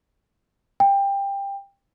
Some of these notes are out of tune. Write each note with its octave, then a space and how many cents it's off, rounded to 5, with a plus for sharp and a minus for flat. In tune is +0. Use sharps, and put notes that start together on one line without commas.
G5 +20